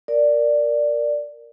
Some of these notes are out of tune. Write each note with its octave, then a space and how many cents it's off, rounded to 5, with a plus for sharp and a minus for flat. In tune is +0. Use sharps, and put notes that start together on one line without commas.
A#4 +0 D5 +0